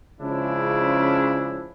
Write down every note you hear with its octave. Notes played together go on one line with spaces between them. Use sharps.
C#3 F3 G#3 C#4 D4 E4